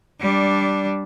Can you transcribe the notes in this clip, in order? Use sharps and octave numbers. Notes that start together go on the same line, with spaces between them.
G3 D4